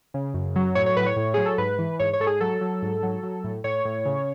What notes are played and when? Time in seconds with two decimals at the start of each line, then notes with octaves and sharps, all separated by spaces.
0.14 C#3
0.34 F#2
0.56 F#3
0.75 A2 C#5
0.86 C#5
0.97 A2 B4
1.06 C#5
1.16 A2
1.34 F#3 G#4
1.46 A4
1.58 G#2 B4
1.79 E3
1.99 G#2 C#5
2.13 C#5
2.20 G#2 A4
2.27 G#4
2.40 F#3 A4
2.61 F#3
2.82 G#2
3.03 F#3
3.23 F#3
3.44 A2
3.64 A2 C#5
3.85 A2
4.05 C#3